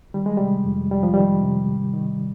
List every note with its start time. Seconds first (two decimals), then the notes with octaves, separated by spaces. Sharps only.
0.14 D#3 G3
0.26 G#3
0.37 C3 G3
0.65 F2
0.91 F2 G3
1.03 F3
1.13 D#3 G3
1.43 C3
1.68 G#2
1.93 D#3